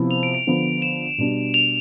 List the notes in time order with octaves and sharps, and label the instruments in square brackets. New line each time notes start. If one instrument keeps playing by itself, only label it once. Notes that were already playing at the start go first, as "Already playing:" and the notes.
Already playing: [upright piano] C3 F3 B3 E4
[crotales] F7
D7
D7
[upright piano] D3 F3 B3
[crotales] E7
[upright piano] B2 G3 D4
[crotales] F7